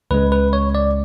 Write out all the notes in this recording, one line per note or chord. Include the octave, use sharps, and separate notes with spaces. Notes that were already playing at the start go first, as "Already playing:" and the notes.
C#2 C#3 G#3 B4
B4
C#5
D5